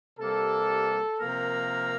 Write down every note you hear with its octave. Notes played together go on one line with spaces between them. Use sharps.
C3 G3 A#3 A4
C3 F3 A#3 A#4